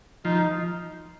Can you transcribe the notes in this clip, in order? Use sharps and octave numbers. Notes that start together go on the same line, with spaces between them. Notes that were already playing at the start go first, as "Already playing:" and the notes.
F3 D#4